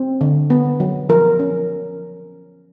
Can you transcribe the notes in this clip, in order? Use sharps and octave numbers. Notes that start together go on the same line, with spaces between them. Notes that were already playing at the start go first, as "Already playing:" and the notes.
Already playing: C4
D3
B3
F#3
F3 A#4
C#4